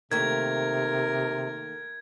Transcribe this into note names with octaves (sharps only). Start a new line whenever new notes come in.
C3 D#3 A3 A#3 A#4 G#6